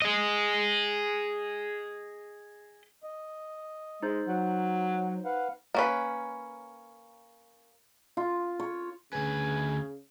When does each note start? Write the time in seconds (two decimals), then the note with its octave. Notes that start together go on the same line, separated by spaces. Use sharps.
0.02 G#4 D#5
3.03 D#5
4.03 G#3 D#4 C5
4.28 F#3 F#5
5.25 B4 F5 F#5
5.74 A#3 C#4 B4
8.17 F4
8.60 C#5
9.13 D2 C#3 B4 G#5